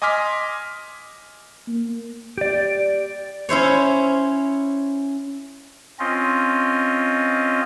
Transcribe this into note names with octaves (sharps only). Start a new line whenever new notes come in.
D#5 G#5 C6 D6 F6 B6
A#3
G4 D5
C#4 E4 C5 C#5
C4 C#4 F4 D#5